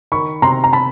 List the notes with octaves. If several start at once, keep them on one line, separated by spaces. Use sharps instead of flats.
D#3 B5 C#6
C3 A#5 C6
A#5
A5 B5